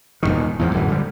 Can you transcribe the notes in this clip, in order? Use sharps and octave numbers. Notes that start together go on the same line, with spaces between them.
D#1 C2 D#3
E2 G#2 F3
D1 F#2 E3
D3 F#3 G3